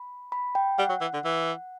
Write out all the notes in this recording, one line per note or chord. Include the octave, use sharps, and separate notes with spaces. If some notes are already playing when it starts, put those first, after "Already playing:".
Already playing: B5
B5
G5
G3 F#5
F#3
E3
D3
E3